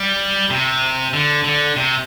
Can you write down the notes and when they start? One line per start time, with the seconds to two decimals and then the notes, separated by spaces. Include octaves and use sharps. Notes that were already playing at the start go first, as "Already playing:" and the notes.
Already playing: G3
0.50 C3
1.13 D3
1.44 D3
1.76 C3